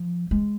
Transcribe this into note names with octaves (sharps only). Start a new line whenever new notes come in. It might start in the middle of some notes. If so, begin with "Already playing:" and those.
Already playing: F3
G#3